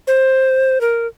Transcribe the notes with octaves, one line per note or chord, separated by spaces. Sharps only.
C5
A#4